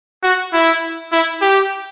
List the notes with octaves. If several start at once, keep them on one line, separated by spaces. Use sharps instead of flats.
F#4
E4
E4
G4